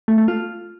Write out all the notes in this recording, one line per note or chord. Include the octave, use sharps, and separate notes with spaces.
A3
A3
F4